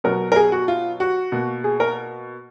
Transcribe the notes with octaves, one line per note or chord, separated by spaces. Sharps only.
B2 F#3 B3 A#4
A#4
G#4
F#4
F4
F#4
B2 A#3
G#4
A#4